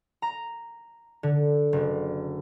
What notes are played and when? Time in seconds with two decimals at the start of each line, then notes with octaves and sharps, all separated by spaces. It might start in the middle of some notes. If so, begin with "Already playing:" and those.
0.22 A#5
1.23 D3
1.73 F#1